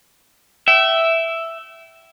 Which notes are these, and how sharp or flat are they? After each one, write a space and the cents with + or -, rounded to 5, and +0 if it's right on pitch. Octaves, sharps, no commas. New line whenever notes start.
E5 +0 G5 -35